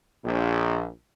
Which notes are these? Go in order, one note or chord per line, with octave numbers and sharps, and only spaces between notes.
A#1